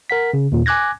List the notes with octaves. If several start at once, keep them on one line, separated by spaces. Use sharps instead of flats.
A#4 F#5 B6
C#3
D#2 A#2
G#5 D6 F#6 G#6 A#6